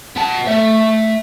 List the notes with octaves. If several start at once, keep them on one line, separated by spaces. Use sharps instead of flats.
B3 A5
A3 E5